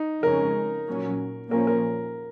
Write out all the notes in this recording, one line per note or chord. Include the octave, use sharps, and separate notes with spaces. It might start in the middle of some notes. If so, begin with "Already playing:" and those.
Already playing: D#4
F2 C#3 G#3 C#4 A#4
A#2 F#3 C#4
A#2 F3 A#3 C#4 A#4
A#4